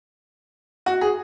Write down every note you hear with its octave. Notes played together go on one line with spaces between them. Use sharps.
F#4
G#4